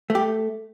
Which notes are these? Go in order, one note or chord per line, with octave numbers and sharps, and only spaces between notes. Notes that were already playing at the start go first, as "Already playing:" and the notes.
A3
G4